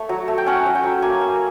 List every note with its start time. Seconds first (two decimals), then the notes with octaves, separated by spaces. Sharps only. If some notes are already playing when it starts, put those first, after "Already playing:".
Already playing: A3 C#5
0.09 F#3
0.28 A3
0.38 G5
0.46 C#4 F#5
0.66 F#3
0.75 G5
0.83 F#3
1.02 A#3 G#5
1.21 A#3